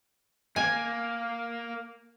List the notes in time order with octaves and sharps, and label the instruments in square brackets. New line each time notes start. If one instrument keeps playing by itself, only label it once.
[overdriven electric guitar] A#3 [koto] G#5